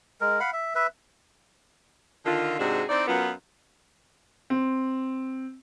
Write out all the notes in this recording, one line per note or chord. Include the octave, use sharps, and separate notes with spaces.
G#3 A#4
F5 F#5 B5
E5
B4 E5
D3 D#3 F4
G#2 C3 G#3 D4 F#4 G#4
C4 D#4 E4 D5
F#2 B3 F4
C4